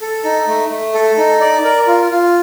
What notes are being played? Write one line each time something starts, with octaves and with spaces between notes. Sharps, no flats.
A4
D#4
A3
A3
A4
D#4
D5
A#4
F4
F4